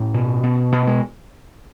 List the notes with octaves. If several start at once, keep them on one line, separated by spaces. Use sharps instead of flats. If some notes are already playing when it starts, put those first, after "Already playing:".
Already playing: A2 C#4
B2
B2
B2 B3
G#3